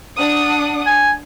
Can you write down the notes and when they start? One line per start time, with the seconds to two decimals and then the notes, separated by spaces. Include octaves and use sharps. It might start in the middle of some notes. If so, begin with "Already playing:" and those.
0.17 D4 F#5 D#6
0.87 G#5